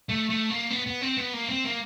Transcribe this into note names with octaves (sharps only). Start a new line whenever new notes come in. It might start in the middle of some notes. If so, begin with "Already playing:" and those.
A3
A3
A#3
B3
B3
C4
B3
A#3
C4
A#3